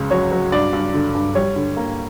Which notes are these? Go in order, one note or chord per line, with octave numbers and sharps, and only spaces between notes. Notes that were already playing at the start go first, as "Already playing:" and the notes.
Already playing: C#2 C#3
F#3 C#5
F#3
G2 D5
G2
D3
G2
G3 C#5
D3
A#3